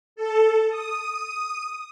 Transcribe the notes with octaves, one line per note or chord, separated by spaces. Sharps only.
A4
D#6